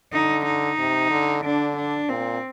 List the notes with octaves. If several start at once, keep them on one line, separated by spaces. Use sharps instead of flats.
D3 D#4
D#4
C3
D3
D3 D4
D4
A#2 C4